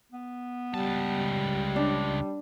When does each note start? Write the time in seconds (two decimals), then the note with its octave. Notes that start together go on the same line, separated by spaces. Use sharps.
0.12 B3
0.74 C#2 G3 A5
1.76 D4